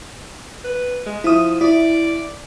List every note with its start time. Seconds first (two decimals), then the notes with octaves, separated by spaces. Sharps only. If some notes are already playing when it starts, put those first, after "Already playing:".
0.65 B4
1.06 G#3
1.24 F3 E4 D#6
1.61 E4 D5